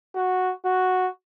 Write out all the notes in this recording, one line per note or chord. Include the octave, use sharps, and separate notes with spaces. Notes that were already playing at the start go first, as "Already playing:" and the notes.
F#4
F#4